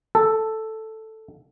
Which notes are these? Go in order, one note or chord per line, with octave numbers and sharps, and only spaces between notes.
A4